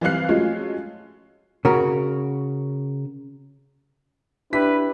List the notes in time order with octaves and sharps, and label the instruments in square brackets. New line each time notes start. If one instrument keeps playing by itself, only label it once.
[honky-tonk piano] E3 G3 C4 F5 F#6 C7
F3 F#3 G#3 A3 C#4 F4
[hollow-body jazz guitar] C#3 F#4 A#4
[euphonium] D4 [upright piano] E4 G4 B6 [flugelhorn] B4